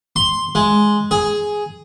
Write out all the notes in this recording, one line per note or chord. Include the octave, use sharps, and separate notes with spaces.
C6
G#3
G#4